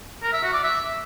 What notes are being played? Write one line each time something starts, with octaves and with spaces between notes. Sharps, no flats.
A#4
E5
F#4
D5
E5